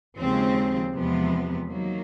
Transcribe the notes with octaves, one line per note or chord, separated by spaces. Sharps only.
D#2 C#3 F3 G#3 C4
E2 C3 F3 G#3 B3
D#3 F#3 A#3